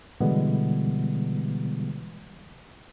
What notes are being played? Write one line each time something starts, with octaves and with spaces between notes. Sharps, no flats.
B2 D3 E3 G3 G#3 B3